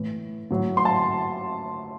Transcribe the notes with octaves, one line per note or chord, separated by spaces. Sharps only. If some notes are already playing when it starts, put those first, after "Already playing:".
Already playing: A2 E3
A2 F#3
C6
A5